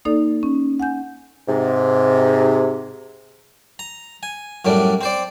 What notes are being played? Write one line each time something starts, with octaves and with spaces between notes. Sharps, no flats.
A#3 D#4 A4 D5
C#4
F#5 G#5 G6
G#2 C3
A#5
G#5
F#2 A2 G3 D4
C4 C5 D5